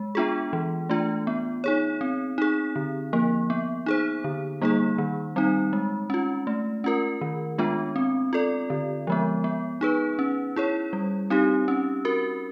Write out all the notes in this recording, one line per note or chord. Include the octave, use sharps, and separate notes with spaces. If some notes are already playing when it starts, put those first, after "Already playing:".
Already playing: G#3
B3 D4 F4 G#4
E3
A3 D4 F4
B3
D#4 G#4 C#5
C4
D#4 G#4
D3
F3 A#3
B3
D#4 G#4 C5
D3
G3 A#3 D#4 G#4
D#3
G3 C4 D#4
G#3
C#4 F4
A3
C#4 F4 A#4
D#3
G#3 B3 D4 F4
C4
F4 A4 D5
D3
F3 G#3 B3
B3
D#4 G#4 B4
C#4
E4 G#4 C#5
G3
C4 D#4 G4
C#4
F#4 A#4